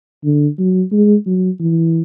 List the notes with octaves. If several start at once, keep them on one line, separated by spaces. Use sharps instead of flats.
D3
F#3
G#3
F#3
E3